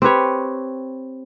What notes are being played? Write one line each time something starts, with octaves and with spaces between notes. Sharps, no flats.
C4 G4 B4 C#5